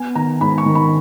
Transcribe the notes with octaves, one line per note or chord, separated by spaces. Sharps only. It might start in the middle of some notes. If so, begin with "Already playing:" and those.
Already playing: B3 G#5
D#3 A#5
G#2 B5
C#6
D#3
B5